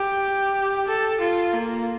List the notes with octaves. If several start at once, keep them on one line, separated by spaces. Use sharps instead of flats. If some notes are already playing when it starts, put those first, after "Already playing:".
Already playing: G4
A4
F4
A#3